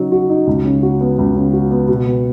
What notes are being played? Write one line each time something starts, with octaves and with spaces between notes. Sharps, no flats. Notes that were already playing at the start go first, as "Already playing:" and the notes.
Already playing: C#3 F#3 D#4 F#4
F#4
D#4
C#2
C#3
F#4
B3
C#2
C#3
F#4
B3
B2
B3